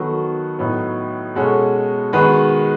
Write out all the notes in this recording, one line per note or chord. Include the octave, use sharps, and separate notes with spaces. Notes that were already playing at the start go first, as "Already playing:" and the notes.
Already playing: D#3 F#3 B3 F#4 A4
A2 F#3 B3 D#4
B2 G#3 C#4 F#4 A4
D#3 G#3 B3 F#4 B4